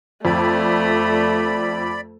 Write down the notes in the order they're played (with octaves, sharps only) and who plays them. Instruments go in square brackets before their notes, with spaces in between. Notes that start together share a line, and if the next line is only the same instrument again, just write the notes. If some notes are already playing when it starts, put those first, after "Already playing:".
[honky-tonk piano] F2 [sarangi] A3 [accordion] D5 B5